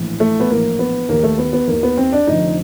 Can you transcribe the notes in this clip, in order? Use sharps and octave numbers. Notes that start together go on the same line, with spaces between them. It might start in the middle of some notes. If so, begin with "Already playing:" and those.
Already playing: A#1 A2 E3
A3
B3
A#1 A2 E3 A#3
B3
D#2 D#3 A#3
A3
B3
B3
D#2 D#3 A#3
B3
C4
D4
F1 F2 D3 D#4